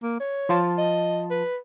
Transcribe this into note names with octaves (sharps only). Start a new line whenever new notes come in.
A#3
C#5
F3 F4 A5
D#5
B4